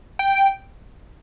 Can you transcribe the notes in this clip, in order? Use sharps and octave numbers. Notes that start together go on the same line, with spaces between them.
G5